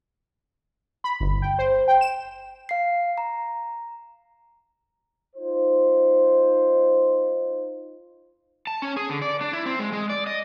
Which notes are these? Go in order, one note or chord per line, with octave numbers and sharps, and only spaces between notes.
B5
G1
G5
C5
G5
E7
F5 C7
A#5
D#4 F4 C5
A5
C#4
G#4
D3
D5
D4
E4
C4
G#3
G#3
D5
D#5